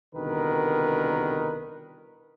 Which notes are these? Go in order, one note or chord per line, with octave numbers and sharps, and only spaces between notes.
C2 B2 D3 D#3 A#4 B4